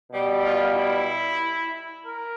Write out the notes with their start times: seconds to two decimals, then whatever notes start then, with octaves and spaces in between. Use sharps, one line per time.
0.10 B2 G3
0.43 F4
0.75 E4
2.04 A#4